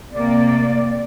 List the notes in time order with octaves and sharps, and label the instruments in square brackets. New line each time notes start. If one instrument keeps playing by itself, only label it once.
[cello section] C3 A#3 [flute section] D5